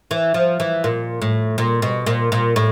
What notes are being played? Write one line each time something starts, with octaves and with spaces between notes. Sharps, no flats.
E3
F3
E3
A#2
A2
A#2
B2
A#2
A#2
A2